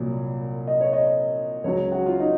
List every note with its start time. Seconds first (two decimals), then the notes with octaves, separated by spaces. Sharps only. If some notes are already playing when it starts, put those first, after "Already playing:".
Already playing: C2 A#2 F#3
0.67 D#5
0.81 C#5
0.93 D#5
1.64 C#2 C#3 F#3 C#5
1.92 F#4
2.06 F4
2.20 D#4